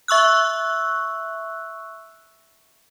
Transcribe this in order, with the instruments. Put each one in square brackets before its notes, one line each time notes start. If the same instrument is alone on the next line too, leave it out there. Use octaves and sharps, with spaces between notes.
[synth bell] E5 C#6 E6 F#6